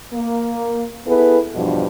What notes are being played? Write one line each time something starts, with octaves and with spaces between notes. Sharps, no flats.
A#3
B3 E4 G#4 A4 B4
E2 G2 B2 F3 D4